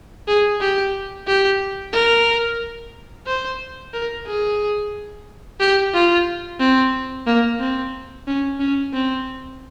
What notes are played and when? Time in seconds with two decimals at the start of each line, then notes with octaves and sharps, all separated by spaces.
0.28 G#4
0.61 G4
1.27 G4
1.93 A#4
3.27 C5
3.94 A#4
4.27 G#4
5.60 G4
5.94 F4
6.60 C4
7.27 A#3
7.60 C4
8.27 C#4
8.60 C#4
8.94 C4